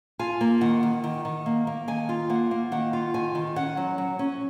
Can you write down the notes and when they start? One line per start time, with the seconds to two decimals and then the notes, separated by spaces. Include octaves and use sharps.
0.19 F4 G#5
0.41 A#3
0.61 D#3 F#5
0.83 D#3
1.04 D#3
1.25 D#3
1.46 A#3
1.67 A#3
1.88 D#3 G#5
2.09 F4
2.30 A#3 F#5
2.51 A#3
2.72 D#3 F#5
2.93 F4
3.14 D#3 G#5
3.35 D#3
3.56 C#4 F#5
3.77 F#3
3.98 F#3
4.19 C#4